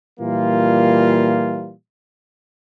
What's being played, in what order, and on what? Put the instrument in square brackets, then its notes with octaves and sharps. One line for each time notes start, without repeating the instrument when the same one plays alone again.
[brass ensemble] A#2 E3 G3 A#3 F4